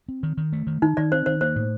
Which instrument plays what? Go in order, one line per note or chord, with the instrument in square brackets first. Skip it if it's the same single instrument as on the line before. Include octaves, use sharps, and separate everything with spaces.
[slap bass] C4
D#3
D#3
A3
D#3
[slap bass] D#3 [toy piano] D#4
[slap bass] D#3 [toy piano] D5
[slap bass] C4 [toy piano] C5
[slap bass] D#3 [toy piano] C5
[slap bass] A#3 [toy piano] C5
[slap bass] A2